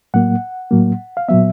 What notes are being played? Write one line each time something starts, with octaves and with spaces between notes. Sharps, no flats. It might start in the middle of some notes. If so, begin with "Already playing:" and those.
A2 F#3 A#3 F#5
A2 F#3 A#3
F5
A#2 F#3 B3 E5